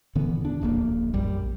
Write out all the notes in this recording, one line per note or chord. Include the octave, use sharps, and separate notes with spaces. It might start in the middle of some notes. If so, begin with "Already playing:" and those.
A#2 D3 E3 B3
E2 D4
D1 A#1 A#3
A#1 F#2 G3